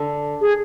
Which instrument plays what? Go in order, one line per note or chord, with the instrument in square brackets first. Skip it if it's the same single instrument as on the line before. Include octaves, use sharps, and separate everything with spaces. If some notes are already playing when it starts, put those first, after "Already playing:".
Already playing: [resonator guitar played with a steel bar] D3
[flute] G#4